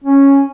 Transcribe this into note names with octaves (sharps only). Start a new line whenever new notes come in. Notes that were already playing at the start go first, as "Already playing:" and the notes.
C#4